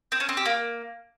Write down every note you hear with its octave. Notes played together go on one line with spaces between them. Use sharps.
C4
C#4
C4
G4
A#3